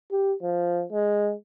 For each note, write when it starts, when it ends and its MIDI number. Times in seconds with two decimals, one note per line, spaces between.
0.11 0.33 67
0.42 0.84 53
0.92 1.34 56